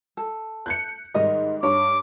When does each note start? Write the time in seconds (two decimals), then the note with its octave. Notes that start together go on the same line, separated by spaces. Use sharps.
0.17 A4
0.66 F#6 G6 C#7
1.14 G#2 D#3 G3 A#4 D#5
1.63 G2 C#5 D6